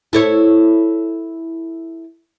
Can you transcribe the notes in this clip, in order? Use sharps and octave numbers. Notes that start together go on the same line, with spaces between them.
E4 A4 C#5